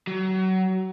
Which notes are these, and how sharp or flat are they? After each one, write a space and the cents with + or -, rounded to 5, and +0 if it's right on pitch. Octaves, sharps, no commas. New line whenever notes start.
F#3 +25